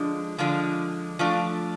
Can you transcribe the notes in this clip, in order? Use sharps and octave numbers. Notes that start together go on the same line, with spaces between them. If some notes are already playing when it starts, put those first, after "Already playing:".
Already playing: D3 F3 G#3 D4
D3 F3 G#3 D4
F3 A3 D4